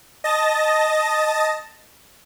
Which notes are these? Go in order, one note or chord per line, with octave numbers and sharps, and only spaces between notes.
D#5 A5 A6 A#6